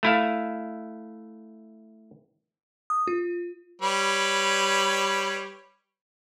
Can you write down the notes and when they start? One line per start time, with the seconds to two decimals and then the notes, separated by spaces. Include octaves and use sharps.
0.03 A3 E4 F5
2.90 D#6
3.07 F4
3.82 G3 B4 C#5